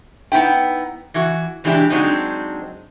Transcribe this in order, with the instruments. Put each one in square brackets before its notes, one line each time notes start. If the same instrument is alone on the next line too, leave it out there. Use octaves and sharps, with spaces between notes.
[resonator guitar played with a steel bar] B3 D#4 E4 G5
E3 F#4
B2 E3 G#3 D4 G4
F#3 G#3 C4 D4 D#4